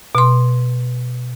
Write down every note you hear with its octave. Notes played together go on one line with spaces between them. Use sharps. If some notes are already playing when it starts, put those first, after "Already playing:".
B2 C6